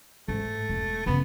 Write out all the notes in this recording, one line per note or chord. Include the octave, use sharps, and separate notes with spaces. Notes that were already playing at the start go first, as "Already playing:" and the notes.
G#2 A3
E1
F#2 C#3 B3